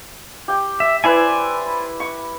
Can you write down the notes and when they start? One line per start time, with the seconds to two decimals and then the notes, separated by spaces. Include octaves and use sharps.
0.48 G4 G5
0.80 E5
1.04 E4 B4 C5 D5 G#5
2.00 C#6